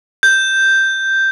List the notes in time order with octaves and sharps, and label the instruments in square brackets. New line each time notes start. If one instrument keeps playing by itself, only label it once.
[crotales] G6